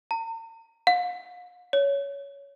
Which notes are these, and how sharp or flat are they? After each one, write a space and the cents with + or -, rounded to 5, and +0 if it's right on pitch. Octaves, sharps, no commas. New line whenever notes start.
A#5 -45
F5 +45
C#5 +15